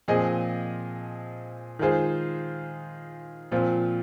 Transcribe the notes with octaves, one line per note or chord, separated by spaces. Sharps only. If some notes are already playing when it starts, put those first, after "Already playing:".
A#2 F3 C4 G#4 D#5
D#3 G#3 F4 G#4 C5
A#2 F3 C4 F4